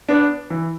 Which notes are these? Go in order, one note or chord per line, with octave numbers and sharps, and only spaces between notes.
B3 D4
E3